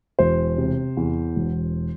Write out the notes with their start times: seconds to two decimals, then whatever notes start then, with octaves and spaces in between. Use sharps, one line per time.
0.19 E1 C5
0.58 C3
0.97 E2
1.36 E1